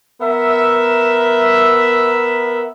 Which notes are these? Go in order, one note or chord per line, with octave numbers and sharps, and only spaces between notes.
B3 A#4 E5